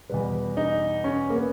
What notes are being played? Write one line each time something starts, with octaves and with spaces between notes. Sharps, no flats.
E2 B2 G3 B4
D#4
C#4
A#3
B3